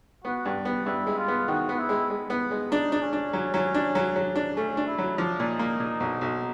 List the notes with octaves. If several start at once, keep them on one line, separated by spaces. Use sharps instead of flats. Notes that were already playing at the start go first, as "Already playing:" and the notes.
B3 F#4
G2
B3
G2 E4
G#3
F4
B3
D#3 F#4
B3
E4
G#3
G#3
B3
G#3
D4 D#4
D4
C#4
D4
F#3
F#3
D4
F#3
F#3
D4
A3 C#4
D4
E4
F#3
F3 D4
A#2
D#4
A#3
A#2
B1
B1